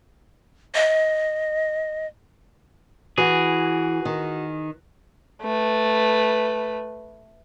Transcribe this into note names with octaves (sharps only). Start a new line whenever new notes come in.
D#5
E3 F#4 G#4
D#3
A3 B4